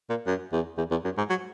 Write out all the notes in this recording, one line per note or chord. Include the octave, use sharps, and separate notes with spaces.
A#2
F#2
E2
E2
E2
F#2
G#2
F#3